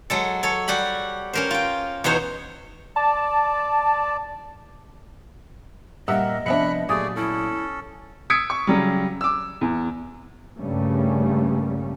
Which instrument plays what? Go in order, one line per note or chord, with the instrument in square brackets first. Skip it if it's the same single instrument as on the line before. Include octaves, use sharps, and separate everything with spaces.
[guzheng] F#3 G#3 A4
A4 C#5
G3 F#4 G4 B5
C#4 A#4 C5
F4 G5
E2 B2 D#4 C5 C#5
[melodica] D5 [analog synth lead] A5
[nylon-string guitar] A#2 G3 G4 [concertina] A#4 [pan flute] D#5 [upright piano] E5 F#5 E6
[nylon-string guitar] C3 F3 B3 [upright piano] D4 E5 C#7 [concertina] B5 F#6
[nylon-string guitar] A#2 F#3 [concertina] A3 G#4 D5 [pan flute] G4 [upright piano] D#6
[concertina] C#4 A4 [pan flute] E4
[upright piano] D#6 E6 G#6 B6 C#7 D7
C#6
C#3 F#3 G3
D6 E6
E2
[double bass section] G2 C#3 G3 A3 A#3 C#4